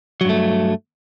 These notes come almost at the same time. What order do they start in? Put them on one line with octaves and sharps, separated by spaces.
F#3 G2 A3